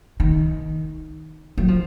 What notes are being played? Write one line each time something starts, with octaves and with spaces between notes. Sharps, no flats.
D#3
F#3
F3